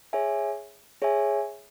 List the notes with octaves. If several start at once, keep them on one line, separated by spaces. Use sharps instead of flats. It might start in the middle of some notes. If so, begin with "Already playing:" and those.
G#4 C#5 E5 G#5
G#4 C#5 E5 G#5